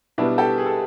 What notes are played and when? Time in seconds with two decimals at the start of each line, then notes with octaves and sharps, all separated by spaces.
0.18 B2 G3 B3 D4 E4
0.38 G4 A4
0.58 G#4
0.66 A4